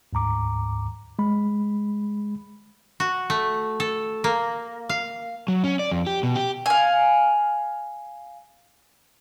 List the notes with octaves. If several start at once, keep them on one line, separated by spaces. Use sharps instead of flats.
D2 G#2 A#5 D6
G#3 B5
F#4
A3
A4
A#3
F5
F#3
C#4
D5
F2
G4
B2
G4
F5 G#5